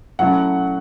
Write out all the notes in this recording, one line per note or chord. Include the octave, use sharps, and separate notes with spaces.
F#3 A3 C#4 E4 F#5